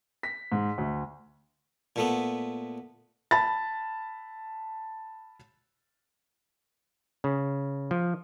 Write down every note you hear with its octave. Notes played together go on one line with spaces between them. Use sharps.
B6
G#2
D2
A#2 A3 B3
A5 B5 A6
C#3
F3